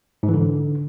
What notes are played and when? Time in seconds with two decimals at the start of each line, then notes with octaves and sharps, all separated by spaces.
0.23 G#2
0.28 E3
0.34 D3